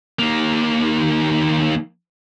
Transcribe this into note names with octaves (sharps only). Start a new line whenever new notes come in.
D#2 A#3